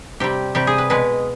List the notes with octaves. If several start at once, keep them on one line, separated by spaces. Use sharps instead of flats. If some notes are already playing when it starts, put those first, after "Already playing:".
C3 G3 G4
C3 G3 G4
G#4
B4
B2 G#3 B4